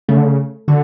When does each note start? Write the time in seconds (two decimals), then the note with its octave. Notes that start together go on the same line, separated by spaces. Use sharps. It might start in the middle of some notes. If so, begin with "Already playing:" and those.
0.09 C#3 A3
0.17 D3
0.24 C#3
0.68 D3 F#4